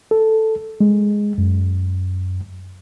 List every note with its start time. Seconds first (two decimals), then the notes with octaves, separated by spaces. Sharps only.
0.11 A4
0.81 G#3
1.38 F#2